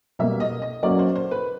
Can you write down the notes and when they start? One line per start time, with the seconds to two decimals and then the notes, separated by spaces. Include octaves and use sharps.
0.19 B2 G3 A#3 E5
0.40 D#5
0.62 D#5
0.83 F#3 A#3 C#4 F#4 D5
0.99 C5
1.15 C5
1.31 B4